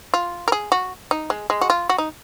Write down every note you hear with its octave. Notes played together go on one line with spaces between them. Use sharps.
F4
A#4
G#4
F#4
D#4
G#3
G#3
F#4
F4
F#4
D#4